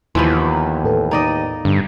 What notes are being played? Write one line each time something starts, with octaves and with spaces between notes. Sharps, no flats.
D#2 E3 F3 B3 C6
A2 A4 B4
D#4 D5 D#5
G2 D3